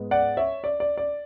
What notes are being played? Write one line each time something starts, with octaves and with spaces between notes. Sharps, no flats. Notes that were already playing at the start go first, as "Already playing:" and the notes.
Already playing: G#2 G#3 B3
D5 F#5
C#5 E5
D5
D5
D5